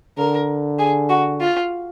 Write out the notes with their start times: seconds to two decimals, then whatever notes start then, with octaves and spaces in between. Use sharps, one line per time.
0.18 D3 A#4
0.79 G#4
1.09 F#4
1.40 F4